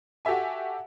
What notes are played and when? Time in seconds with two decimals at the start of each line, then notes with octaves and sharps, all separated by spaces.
0.25 F#4 G4 A4 E5 G#5